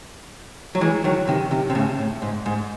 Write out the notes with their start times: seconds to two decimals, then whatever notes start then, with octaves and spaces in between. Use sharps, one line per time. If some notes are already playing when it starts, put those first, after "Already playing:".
0.75 F#3
0.81 E3 G#3
1.04 D#3 F#3
1.28 C3 D#3
1.51 C3 D#3
1.70 C3
1.75 A2 C#3
1.99 A2
2.22 G#2
2.46 G#2